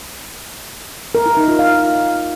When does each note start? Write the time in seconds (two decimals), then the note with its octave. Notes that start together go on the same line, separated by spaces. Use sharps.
1.15 A#4
1.26 E4
1.37 D#4
1.48 F4
1.59 F5